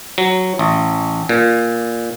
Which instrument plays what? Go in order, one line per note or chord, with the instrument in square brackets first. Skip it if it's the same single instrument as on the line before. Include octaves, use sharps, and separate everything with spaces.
[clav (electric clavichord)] F#3
A1
A#2